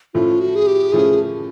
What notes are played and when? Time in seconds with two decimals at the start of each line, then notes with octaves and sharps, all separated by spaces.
0.14 A2 F3 A3 C#4 F4
0.40 F#4
0.56 G#4
0.67 G4
0.92 A2 F3 A3 C#4 G#4